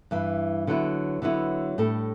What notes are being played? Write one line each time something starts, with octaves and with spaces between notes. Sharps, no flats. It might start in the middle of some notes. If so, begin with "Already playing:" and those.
G2 E3 G3
D3 F#3 B3 E4
D3 F#3 B3 E4
A2 G3 D4 A4